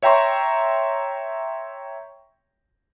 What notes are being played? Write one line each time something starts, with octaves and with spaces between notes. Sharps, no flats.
C#5 E5 G5 A#5 C6 C#6